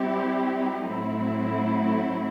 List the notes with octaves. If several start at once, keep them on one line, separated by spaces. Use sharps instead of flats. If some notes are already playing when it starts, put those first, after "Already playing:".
Already playing: G3 C4 E4 G4
A2 F#3 A3 C4 E4